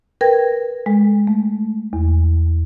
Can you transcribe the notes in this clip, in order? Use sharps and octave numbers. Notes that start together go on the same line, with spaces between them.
A#4 B4 G5 G#6 A#6
G#3 A4
A3
E2